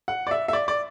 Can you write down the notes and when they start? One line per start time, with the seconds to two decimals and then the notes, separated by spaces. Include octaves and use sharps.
0.08 F#5
0.27 D5
0.31 E5
0.48 E5
0.53 D5
0.68 D5